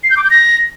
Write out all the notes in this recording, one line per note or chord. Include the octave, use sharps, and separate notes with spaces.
C7
G6
D6
G6
A#6